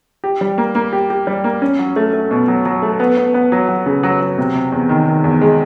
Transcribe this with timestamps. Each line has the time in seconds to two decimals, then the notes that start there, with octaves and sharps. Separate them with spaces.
0.24 G4
0.41 G3
0.58 A#3
0.75 A#3
0.93 G4
1.10 G4
1.27 G3
1.44 A#3
1.62 C#4
1.79 F#3
1.96 A3
2.13 A3
2.31 B2
2.48 F#3
2.65 F#3
2.82 A3
3.00 B3
3.17 B3
3.34 B3
3.52 F#3
3.69 F#3
3.86 C#3
4.03 F#3
4.21 F#3
4.38 C3
4.55 C3
4.72 E2
4.89 D#3
5.07 D#3
5.24 E2
5.41 G#3